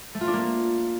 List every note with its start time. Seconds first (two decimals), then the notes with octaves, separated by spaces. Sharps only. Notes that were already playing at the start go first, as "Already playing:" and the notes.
0.15 A3
0.21 F4
0.27 D4
0.33 A#3